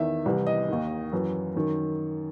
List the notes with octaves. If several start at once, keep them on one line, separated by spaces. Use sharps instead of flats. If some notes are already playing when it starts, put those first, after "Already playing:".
Already playing: E2 D#3 E5
C2 C3 E3
D#5
D#2 D#3
F#2 E3
F#2 D#3